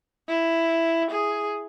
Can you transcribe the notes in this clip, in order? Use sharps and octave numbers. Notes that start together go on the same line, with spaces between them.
E4
G#4